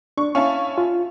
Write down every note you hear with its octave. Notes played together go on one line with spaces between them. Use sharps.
D4 C#6
C#4 E4 F5 A5 C#6
F4